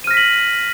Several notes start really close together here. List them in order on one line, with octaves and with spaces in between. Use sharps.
D#7 F6 A#6 B6 F#7